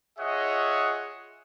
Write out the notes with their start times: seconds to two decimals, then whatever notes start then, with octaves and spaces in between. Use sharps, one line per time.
0.19 F4 G#4 C#5 D#5 E5 F#5